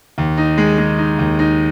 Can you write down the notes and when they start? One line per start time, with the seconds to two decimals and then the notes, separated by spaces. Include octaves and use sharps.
0.18 D#2
0.37 D#4
0.58 G#3
0.78 G#3
0.98 D#4
1.19 D#2
1.39 D#4